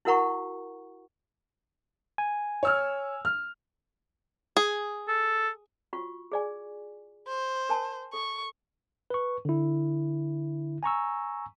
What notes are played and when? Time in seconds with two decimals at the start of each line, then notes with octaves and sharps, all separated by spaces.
0.05 E4 F#4 A#4 F#5 A#5 C#6
2.18 G#5
2.63 C#5 E6 F6
3.25 F6
4.57 G#4
5.08 A4
5.93 F4 F#4 C#6
6.32 G#4 D5 G#5
7.28 C5
7.69 A#4 G#5 A5
8.13 A4 C#6
9.10 B4 C#6
9.45 D3 E4
10.83 G#5 A#5 C#6 E6